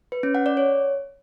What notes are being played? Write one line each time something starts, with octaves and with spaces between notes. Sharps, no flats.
B4
C#4
F#5
D5
C#5